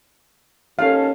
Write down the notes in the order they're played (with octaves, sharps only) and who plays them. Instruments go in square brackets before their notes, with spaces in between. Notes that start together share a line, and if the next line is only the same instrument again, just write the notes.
[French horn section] D#2 C#4 A4 [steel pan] F5